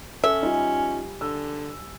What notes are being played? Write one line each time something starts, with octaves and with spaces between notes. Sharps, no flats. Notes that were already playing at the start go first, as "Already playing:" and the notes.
C#4 A4 E5
G3 D#4 F4 G#5
D3 E6